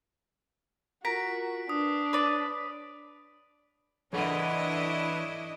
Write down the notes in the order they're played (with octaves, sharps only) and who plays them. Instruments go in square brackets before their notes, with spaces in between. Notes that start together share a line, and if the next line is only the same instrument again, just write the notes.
[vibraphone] F4 A#4 [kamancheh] F#4 [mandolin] A#5 [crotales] B6 D7
[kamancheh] D4 [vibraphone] B4 [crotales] D#6
[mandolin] B4 D5 [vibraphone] C#5 B5
[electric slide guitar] E3 A4 F#5 [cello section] D4 E4 D#5 [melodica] B4 C#5